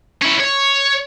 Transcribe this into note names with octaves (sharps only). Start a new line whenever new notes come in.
C#4 E4
C#5